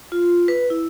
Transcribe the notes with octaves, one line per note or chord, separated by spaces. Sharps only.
F4
B4
E4